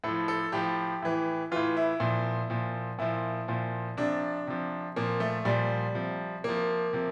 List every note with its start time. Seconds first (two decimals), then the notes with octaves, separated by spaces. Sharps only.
0.04 A2 F3 A4
0.28 A4
0.52 A2 F3 G4
1.02 A2 E3
1.51 A2 E3 F4
1.77 E4
2.00 A#2 F3
2.50 A#2 F3
2.99 A#2 F3 E4
3.48 A#2 F3
3.97 C3 F3 D4
4.47 C3 F3
4.96 A#2 F3 A#3
5.20 A3
5.45 A#2 F3 G3
5.94 C3 F3
6.44 C3 F3 A#3
6.93 C3 F3